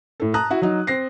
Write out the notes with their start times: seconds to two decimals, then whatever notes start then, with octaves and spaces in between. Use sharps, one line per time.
0.20 A2 A4
0.34 A5 A#5 D#6 F#6
0.50 E4 F#4
0.62 F#3 D#4
0.87 C4 A#6 C7